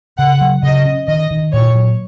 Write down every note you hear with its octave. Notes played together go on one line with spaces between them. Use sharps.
C#3 F#5
F#3
C#3 D#5
C#4
D#3 D#5
D#3
A#2 C#5
F#3